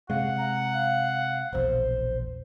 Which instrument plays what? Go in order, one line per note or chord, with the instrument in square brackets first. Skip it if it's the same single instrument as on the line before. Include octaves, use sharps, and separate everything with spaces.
[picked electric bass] C3 G#3 [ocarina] F5 [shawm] F#5
[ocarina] A#5
F5
[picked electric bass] E1 A#1 [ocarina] C5